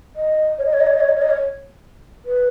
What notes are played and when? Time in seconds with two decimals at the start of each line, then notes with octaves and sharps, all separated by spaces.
0.16 D#5
0.59 C#5
0.65 D#5
0.73 C#5
0.80 D#5
0.87 C#5
0.93 D#5
1.00 C#5
1.09 D#5
1.16 C#5
1.22 D#5
1.30 C#5
2.25 B4